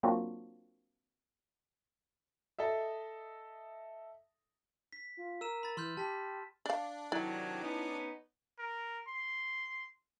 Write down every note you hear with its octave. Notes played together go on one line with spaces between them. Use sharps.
F#3 A#3 C4 D4 F4 F#4
A4 D#5 E5
B6
F4
A#4 E6 D#7 E7
B5 A6
E3 C6 F6 G6
G4 A5 B6
D4 D5 F5
C3 D#3 F#3 E4 D5
B3 C#4 D#4
A#4
C6